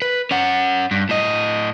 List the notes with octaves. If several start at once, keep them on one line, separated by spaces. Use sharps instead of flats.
B4
C#4 F#5
G2
A2 D#5